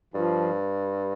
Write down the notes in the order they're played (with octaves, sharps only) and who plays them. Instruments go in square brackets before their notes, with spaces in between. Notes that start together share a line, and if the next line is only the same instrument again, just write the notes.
[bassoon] G2 [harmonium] F3